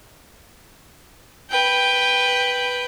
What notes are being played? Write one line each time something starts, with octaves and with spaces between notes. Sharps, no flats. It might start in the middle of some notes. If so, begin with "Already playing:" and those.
B4 G5